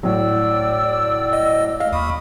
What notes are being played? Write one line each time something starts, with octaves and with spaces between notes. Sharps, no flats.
A2 F#3 D5 E6
D#5
D#5 F5
D#2 B5 C#6 D#6